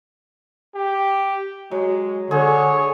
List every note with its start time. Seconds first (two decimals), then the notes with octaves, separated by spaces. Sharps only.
0.75 G4
1.71 F#3 G#3
2.31 D3 G#4 C#5